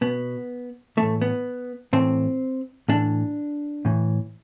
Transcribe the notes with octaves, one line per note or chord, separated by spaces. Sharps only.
B2 B3
A2 E3 A3
B3
A2 E3 C4
A2 E3 D4
A2 E3